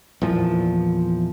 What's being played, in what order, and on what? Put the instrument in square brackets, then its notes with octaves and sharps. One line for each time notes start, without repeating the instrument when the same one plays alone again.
[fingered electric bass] E2 A#2 F3